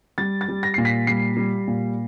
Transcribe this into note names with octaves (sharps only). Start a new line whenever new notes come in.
G3 A6
A6
G3
A#6
A#2 C7
B6
G3 C7
G3
A#2